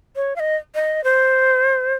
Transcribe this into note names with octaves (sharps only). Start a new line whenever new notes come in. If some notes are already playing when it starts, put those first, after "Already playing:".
C#5
F5
D#5
D#5
C5